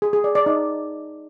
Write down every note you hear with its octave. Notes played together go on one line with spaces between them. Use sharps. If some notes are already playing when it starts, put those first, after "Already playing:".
G#4
G#4
D5
D5
D#4